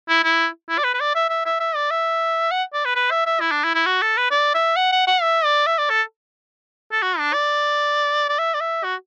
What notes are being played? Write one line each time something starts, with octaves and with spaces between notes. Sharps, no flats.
E4
E4
E4
D5
B4
B4
D5
E5
E5
E5
E5
D5
E5
F#5
D5
B4
B4
E5
E5
E4
D4
E4
E4
F#4
A4
B4
D5
E5
F#5
F#5
F#5
E5
D5
E5
D5
A4
A4
F#4
D4
D5
D5
E5
D5
E5
F#4